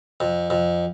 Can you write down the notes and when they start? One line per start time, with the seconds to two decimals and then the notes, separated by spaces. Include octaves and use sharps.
0.20 F2
0.50 F2